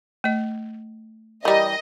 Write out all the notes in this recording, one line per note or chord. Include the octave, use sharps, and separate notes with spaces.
A3 D#5
E3 G3 A#4 D#5 A#5